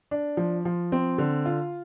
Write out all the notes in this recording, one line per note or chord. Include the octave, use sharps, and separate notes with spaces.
D4
F3
F3
C4
D3
F4